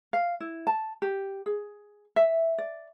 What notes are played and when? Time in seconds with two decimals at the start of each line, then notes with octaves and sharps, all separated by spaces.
0.13 F5
0.40 E4
0.67 A5
1.02 G4
1.46 G#4
2.16 E5
2.58 D5